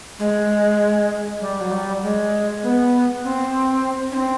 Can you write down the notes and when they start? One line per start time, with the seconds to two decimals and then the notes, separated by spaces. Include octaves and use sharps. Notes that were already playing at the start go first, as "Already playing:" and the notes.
0.19 G#3
1.41 G3
1.61 F#3
1.71 G3
2.02 G#3
2.63 B3
3.24 C4
4.11 C#4
4.15 C4